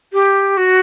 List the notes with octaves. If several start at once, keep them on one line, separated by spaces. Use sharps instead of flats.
G4
F#4